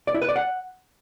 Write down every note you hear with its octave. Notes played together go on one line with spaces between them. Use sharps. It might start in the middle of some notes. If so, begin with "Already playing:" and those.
D5
E4
B4
D5
F#5